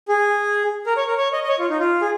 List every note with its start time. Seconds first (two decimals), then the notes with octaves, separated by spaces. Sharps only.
0.08 G#4
0.86 A#4
0.97 C#5
1.07 A#4
1.17 C#5
1.33 D#5
1.44 D#5
1.49 C#5
1.59 F4
1.70 D#4
1.80 F4
2.01 G#4